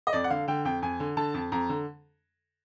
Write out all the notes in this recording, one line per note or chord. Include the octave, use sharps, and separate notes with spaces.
D#5
F2 D5
F#5
D3 F5
D3 G5
F2 G5
F2 G#5
D3
D3 A5
F2
F2 A#5
D3